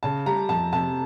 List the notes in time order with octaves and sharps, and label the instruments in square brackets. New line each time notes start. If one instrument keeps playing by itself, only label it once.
[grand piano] C#3 [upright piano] A5
[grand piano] G3 [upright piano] A#5
[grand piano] F2 [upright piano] A5
[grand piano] C3 [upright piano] A5